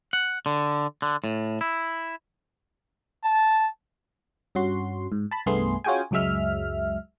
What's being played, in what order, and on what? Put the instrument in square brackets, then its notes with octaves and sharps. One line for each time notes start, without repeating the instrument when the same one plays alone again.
[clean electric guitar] F#5
D3
D3
A2
E4
[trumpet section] A5
[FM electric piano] G2 C#4 F#4 C6
G#2
A5 B5
C2 G2 A3 B3 G#4 C6
C#4 F4 F#4 G#4 G5 G#5
C#2 F#2 F#3 G#3 E5 F6